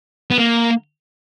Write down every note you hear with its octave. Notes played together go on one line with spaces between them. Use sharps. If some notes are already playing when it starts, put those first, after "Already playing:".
B3
A#3